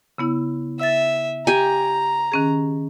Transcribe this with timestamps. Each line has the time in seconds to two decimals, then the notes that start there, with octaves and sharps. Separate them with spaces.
0.18 C#3 B3 E4
0.79 E5 E6 A6
1.47 G4 G#5 A#5
2.32 D#3 C#4 G#4